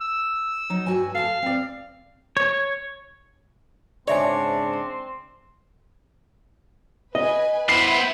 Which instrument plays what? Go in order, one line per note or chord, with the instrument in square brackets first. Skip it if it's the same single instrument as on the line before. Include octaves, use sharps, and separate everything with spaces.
[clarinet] E6
[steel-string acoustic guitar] F#3 D#4
G2 F#4 G#5
[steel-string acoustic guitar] A4 D#5 A5 [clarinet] F5
[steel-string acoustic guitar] C4 D5
[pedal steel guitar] C#5
[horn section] G#2 C#3 D4 [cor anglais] C4 [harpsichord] C#5 [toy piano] D5 E5 G#5
[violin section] B4 G#5 [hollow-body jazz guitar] D#5
[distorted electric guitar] B3 C5 [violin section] E4 B4 B5 [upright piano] C7